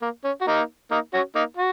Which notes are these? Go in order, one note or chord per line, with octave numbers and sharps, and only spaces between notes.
A#3
C#4
F#4
A#3 D#4
A#3 D#4
C#4 F#4
A#3 D#4
F#4